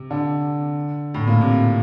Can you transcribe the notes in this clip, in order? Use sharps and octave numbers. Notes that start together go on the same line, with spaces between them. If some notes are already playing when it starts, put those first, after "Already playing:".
Already playing: C3
D3
A2
A#2
C3